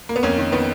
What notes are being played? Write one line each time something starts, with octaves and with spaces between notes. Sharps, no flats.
A#3
B3
F2 A#3 C#4
D#3
D#3 B3